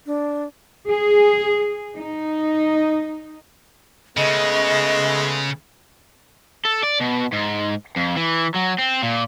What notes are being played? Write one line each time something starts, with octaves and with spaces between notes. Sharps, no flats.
D4
G#4
D#4
C#3 G#3 A3 B3 D#5
A4
D5
B2
G#2
F2
E3
F#3
C4
A#2